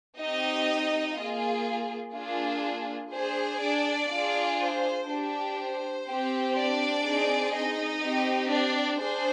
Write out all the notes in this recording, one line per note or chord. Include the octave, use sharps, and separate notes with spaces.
C4 D#4 G4 D#5
A#3 F4 G#4
A#3 D4 F4 G#4
D4 G#4 C5
D4 D5
D4 F4 G#4
C5
D4 G4
C5
C4 G4
D4 D5
C4 D#4 G#4
D#4 D#5
C4 G4
D4 D5
D4 G#4 C5